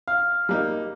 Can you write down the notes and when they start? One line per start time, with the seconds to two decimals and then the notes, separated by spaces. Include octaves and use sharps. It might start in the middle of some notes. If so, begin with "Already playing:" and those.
0.08 F5 F6
0.49 G3 A#3 D#4